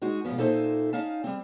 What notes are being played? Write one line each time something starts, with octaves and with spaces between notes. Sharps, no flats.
G#3 D#4 F#4
G#2 B2 D#3 F3 B3
A#2 D#4 A4 C5 E5
C#4 D#4 F5 A5
G3 C4